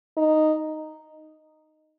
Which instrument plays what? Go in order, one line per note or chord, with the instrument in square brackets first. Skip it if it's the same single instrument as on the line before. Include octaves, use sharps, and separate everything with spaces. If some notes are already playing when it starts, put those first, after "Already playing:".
[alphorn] D#4